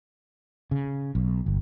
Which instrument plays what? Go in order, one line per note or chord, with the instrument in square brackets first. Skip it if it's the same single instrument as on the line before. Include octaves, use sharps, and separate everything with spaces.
[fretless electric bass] C#3
B1
G1